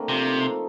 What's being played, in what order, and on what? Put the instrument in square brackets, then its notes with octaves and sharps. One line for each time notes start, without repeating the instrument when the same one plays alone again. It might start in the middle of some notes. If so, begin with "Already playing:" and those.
Already playing: [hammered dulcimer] D3 A3 A#3 C4
[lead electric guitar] C3 [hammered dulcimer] F3
[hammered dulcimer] D#4
A4